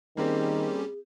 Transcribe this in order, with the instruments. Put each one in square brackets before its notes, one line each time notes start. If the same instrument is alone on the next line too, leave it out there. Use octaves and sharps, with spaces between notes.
[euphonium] D#3 [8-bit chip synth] G3 C#4 G4 [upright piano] A#3 C4 [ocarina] G#4